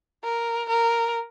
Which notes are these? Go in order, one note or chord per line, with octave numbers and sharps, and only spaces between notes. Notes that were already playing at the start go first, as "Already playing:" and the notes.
A#4
A#4